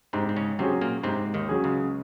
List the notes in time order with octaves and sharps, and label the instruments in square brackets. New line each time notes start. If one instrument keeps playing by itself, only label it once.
[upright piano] G#2 [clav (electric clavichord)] C3 C4
[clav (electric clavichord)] C4
C#3 C#4
[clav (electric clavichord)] C3 C4 [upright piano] F#3 C#4 G#4
[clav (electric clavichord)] A#2 A#3
[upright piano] G#2 [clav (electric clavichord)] C3 C4
[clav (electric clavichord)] D#2 D#3
[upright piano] F#3 C#4 G#4
[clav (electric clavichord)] C#2 C#3